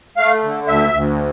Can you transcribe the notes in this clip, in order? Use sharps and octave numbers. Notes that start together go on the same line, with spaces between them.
A3 F5
D3
D2 E5
D2